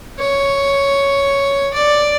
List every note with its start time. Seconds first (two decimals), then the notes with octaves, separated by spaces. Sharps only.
0.19 C#5
1.74 D5